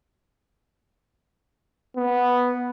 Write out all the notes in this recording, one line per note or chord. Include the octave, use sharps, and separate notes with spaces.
B3